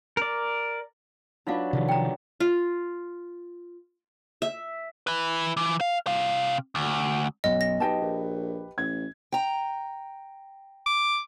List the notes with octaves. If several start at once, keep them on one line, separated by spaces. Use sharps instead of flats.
A#4 D5
F#3 D4 D#4 F4 B4 F5
C3 D#3 F3
G5 A#5
F4
E5
E4 B4
E3
F5
C3 F5
D2
B1 F#2 B2 D#5
A#6
B1 G4 B4 D#5 G5 A5
A#1
A1 G#6
G5 A#5
D6